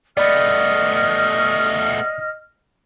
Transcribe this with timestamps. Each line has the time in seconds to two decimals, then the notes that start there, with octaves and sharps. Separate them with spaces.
0.17 A3 B3 D5 D#5 B5 F6 A6